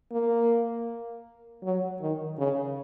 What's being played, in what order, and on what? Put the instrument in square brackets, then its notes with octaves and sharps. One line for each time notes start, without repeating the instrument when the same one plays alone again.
[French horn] A#3
F#3
D#3
C#3